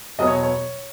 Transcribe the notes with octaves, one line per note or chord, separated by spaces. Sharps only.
E2 B2 F#3 B3 D#5
C#5
C#5